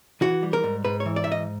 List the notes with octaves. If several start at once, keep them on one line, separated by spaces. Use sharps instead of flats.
E3 F#4
G3
A#4
G#2
G#2 B4
C#5
E3
D5
G#2 E5
D#5